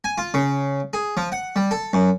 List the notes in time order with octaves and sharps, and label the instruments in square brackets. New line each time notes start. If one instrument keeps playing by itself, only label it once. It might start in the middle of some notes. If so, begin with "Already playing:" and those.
[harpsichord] G#5
F4
C#3
G#4
F3
F#5
G3
A4
F#2